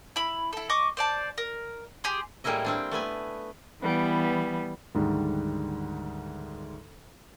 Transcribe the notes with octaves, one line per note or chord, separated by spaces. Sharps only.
E4 B5
E4 A4
D#5 C#6 D6
C5 D5 A5
A#4
G4 G#4 C6
A2 G3 G#3 A#3 E4 D#5
G3 C4 D4
A3 B3 B4 G#5
E3 G3 B3
D2 G#2 D#3 G3